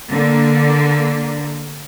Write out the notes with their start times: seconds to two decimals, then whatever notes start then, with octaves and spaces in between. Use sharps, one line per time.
0.10 D3 A#3